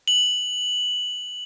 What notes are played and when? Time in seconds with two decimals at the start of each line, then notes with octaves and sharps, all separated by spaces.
0.08 F#7